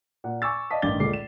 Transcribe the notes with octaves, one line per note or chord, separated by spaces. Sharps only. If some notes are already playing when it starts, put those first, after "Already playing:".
A#2 F#5
G#5 C#6 D6 E6 A6
D5 D#5 F5 A5 D#6 B6
A1 G2 D#3 D6 A6 G7
C#2 A#2 G#3 A3 D6 C7
E7